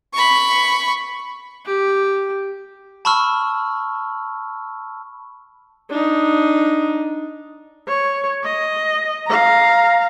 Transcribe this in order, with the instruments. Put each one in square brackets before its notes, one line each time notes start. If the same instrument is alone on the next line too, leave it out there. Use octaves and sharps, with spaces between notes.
[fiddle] B5 C#6
[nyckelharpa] G4
[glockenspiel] A5 B5 C#6 E6 F6
[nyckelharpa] D4 D#4
[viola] C#5
D#5
F5 A#5